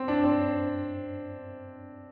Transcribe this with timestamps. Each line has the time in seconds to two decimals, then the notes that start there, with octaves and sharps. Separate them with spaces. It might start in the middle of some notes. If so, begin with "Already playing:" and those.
Already playing: C4
0.08 D4
0.24 C4